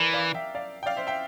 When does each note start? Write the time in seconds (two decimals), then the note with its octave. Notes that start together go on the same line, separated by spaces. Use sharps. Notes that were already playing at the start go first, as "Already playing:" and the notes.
Already playing: E3 A#4 D5
0.13 D5 F5
0.35 E5 G5
0.55 D5 F5
0.83 G5
0.86 D5 F5
0.96 C5 E5
1.07 E5 G5